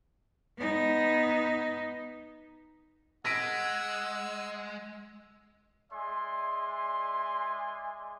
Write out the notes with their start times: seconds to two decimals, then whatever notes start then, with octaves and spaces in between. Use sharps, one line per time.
0.58 B3 D#4
3.25 G#3 F#5 E6 A#6 B6 D7
5.91 G#3 D5 E5 G#5 C6